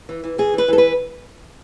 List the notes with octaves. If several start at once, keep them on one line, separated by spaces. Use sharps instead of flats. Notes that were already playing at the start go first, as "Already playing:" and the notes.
E3
E3
E3 G#4
E3 B4
E3 A4
B4